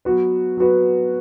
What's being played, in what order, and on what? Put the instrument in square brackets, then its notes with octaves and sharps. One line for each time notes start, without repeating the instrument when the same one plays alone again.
[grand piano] F#3 B3 F#4 B4
F#3 B3 F#4 B4